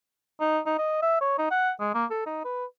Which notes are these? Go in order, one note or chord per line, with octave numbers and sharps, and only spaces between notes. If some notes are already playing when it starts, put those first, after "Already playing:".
D#4
D#4
D#5
E5
C#5
D#4
F#5
G#3
A#3
A4
D#4
B4